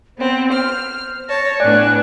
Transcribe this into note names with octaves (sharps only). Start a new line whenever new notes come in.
B3 C4 C5
F6
C#5 A5 A#6
A2 B3 D4 D5 G#5 F#6